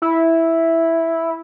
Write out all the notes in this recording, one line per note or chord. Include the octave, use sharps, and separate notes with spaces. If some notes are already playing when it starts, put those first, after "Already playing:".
E4